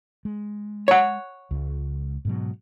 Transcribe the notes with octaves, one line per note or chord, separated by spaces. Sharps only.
G#3
C#5 F#5
C#2
G#2 B2 F#3